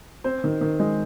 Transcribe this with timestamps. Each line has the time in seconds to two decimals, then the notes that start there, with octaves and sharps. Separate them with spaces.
0.24 C4 C5
0.44 D#3
0.61 D#3
0.80 G#3